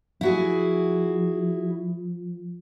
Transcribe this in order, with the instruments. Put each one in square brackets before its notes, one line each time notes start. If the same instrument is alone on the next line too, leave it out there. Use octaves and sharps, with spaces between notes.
[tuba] F3 [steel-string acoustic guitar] E4 F#4 G#4